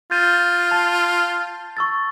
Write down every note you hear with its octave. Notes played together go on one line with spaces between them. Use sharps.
F4 G6 A6 D#7
A5
C#6 E6 A6